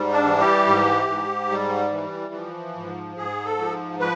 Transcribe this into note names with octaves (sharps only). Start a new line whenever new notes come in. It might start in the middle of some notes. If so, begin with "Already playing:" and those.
Already playing: G#2 G3
D4
E3
G4
G#2
G#2
G3
E3
F3
G#2
G#2 G#4
A4
F3
F3 B4